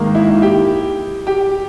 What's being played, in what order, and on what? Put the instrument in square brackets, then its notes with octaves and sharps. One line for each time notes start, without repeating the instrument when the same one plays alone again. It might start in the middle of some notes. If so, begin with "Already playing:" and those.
Already playing: [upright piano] G#2 D#3 A#3 [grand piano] D#4
[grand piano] E4
G4
G4